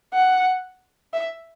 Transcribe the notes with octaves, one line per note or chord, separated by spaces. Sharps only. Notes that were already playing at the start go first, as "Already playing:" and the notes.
F#5
E5